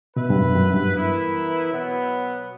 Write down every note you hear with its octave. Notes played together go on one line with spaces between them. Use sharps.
B2 B3 E4 B4
G2
F#2
F#2
G2
E3 B3 E4 A#4
B2 F#3 B3